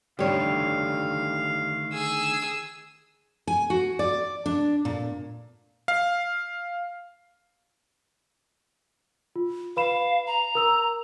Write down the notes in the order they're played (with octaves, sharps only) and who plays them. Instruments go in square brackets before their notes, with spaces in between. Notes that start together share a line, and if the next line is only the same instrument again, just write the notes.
[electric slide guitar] D3 D#3 A3 [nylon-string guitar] G3 C#5 [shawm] F5
[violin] G#4 E6
[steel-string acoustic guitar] G#5
F#4
D5
D4
A#2
[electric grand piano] F5
[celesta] F4
[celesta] B4 B5 E7 [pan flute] F5
[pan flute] A#5
[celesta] A#4 E6 F7